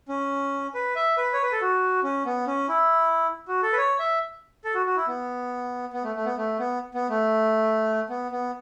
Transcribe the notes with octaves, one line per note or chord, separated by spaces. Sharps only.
C#4
B4
E5
B4
C#5
B4
A4
F#4
C#4
B3
C#4
E4
F#4
A4
B4
C#5
E5
A4
F#4
F#4
E4
B3
B3
A3
A3
B3
A3
B3
B3
A3
B3
B3